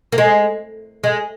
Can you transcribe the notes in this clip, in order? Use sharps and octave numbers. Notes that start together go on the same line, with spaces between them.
A#3
G#3
G#3